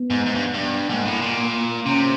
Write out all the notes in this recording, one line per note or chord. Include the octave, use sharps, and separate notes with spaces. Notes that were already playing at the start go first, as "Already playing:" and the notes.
Already playing: B3
G#2
G#2
G2
G2
G#2 A#3
A2
A#2
A#3
C3 C#4